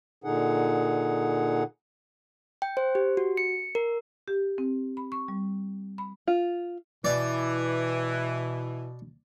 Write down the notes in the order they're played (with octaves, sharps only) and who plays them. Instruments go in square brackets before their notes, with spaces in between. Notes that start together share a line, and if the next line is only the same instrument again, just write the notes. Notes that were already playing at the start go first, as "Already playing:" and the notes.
[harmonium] A#2 D3 D#4 G#4 F#5
[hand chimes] G5
C5
G4
F#4
C#7
A#4
[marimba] G4
C4
B5
C#6
G3
B5
[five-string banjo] F4
[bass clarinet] B2 [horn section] E3 [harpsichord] D5